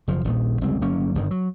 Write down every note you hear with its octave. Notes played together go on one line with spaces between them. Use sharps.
F#1 F3
D#1 A#1 A#2 D#3
F1 C#2 G3 C4
G1 F#3 A#3 C#4
G1 G2 D#3
F#3